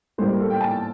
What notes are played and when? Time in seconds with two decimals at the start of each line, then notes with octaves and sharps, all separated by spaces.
0.18 A2 G3 A#3 C5
0.28 A#4
0.40 A4
0.50 G5
0.61 A5